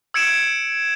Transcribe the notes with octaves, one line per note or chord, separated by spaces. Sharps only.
E6 G#6 C#7 D7 E7